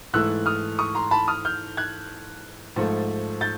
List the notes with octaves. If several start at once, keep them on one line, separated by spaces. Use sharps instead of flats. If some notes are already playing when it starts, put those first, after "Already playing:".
G#2 E3 A3 E6 F#6
D#6 F6
C#6 D#6
A#5 C6
A5 B5
D#6 F6
F6 G6
F#6 G#6
G#2 F3 A3
G6 A6